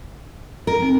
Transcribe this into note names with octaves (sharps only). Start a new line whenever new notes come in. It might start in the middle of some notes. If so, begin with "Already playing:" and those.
A#4
C4 D#4